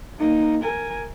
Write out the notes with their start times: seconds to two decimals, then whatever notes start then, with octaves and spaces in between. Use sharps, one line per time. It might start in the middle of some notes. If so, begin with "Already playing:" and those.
0.19 A#3 D#4
0.64 A#4 G#5